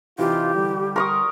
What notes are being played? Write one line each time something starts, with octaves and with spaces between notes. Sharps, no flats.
C3 E3 D#4 F4 G4
D3 G3
A#4 C6 C#6 D#6